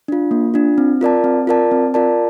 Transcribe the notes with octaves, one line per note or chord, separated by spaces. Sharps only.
D4 F4
A#3
D4 F4
C4
F4 A#4 D5 A5
C4
F4 A#4 D5 A5
C4
F4 A#4 D5 A5